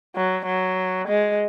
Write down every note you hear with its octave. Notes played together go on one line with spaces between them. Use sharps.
F#3
F#3
G#3